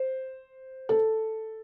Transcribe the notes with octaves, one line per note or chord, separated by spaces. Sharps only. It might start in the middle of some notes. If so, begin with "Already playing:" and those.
Already playing: C5
A4